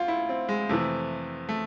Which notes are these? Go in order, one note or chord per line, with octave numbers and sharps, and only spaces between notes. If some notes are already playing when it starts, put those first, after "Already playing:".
Already playing: D2 F4
E4
C4
G#3
F2 C3 E3 A3
A3